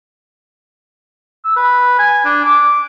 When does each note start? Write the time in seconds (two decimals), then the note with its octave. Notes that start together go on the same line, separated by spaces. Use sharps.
1.45 E6
1.57 B4
1.99 G#5
2.25 D4
2.45 D6